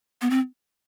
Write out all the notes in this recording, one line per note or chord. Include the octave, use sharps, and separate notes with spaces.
B3
C4